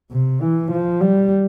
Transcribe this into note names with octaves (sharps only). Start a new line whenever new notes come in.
C3
E3
F3
G3